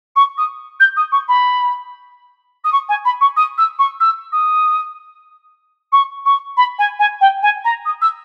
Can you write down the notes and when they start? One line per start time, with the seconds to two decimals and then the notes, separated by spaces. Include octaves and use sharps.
0.16 C#6
0.37 D#6
0.80 G6
0.96 D#6
1.12 C#6
1.28 B5
2.64 D#6
2.72 C#6
2.89 G#5
3.05 B5
3.21 C#6
3.36 D#6
3.58 E6
3.79 C#6
4.00 E6
4.32 D#6
5.92 C#6
6.25 C#6
6.57 B5
6.78 G#5
6.99 G#5
7.21 G5
7.42 G#5
7.64 A#5
7.85 D#6
8.01 E6